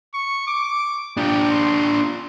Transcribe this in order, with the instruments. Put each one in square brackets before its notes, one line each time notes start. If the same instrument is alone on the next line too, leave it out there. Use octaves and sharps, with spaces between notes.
[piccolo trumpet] C#6
D6
[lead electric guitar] D4 F4 [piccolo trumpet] G4
[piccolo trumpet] C6